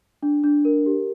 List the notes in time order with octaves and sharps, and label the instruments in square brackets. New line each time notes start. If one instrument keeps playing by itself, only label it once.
[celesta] D4
D4
A#4
G4